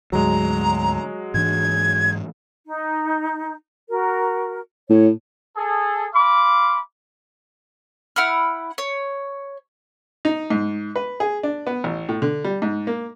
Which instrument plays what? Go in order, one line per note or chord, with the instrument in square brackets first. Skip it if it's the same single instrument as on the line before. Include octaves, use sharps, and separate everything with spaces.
[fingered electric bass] D2 G#2 [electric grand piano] F#3 G#3 [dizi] A#5
[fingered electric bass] G#2 E3 D4 [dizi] G#6
[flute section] D#4
F#4 A#4
[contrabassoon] A2 [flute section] C#5
[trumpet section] G#4 A4
F5 B5 C6 D6
[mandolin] E4 F#5 B5 F6
C#5
[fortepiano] D#4
G#2
B4
G#4
D4
B3
A1
A2
D3
G3
G#2
A#3